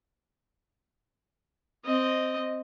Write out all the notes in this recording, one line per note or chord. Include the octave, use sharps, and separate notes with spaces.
C4 D#5